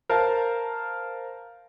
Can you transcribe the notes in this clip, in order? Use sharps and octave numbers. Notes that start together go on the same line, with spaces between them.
A#4 C5 F5 A5